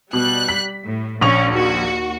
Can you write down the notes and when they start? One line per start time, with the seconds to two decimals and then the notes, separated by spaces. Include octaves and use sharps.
0.13 B2 G3 F#6
0.48 B6
0.84 A2
1.21 A#1 C#4 C#6 F7
1.51 D#2 F#4